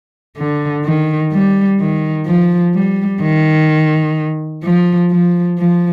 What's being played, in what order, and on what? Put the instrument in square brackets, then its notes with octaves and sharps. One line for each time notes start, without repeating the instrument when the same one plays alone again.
[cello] D3
D#3
G3
D#3
F3
G3
D#3
F3
F3
F3